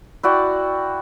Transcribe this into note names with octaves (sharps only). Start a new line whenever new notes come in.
E4 F#4 D5 G5